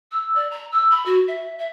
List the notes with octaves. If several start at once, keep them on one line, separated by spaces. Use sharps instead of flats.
E6
D5
A#5
E6
B5
F#4
E5
E5